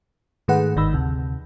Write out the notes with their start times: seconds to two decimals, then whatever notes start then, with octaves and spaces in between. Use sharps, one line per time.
0.48 G#2 D#3 A3 G#4 B4 F#5
0.76 G1 G#2 D#3 D#4 B5 E6
0.94 D2 C3